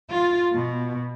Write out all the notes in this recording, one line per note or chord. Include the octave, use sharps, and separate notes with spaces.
F4
B2